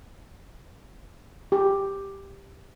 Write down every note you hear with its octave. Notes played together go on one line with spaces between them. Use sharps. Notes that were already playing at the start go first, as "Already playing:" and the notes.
G4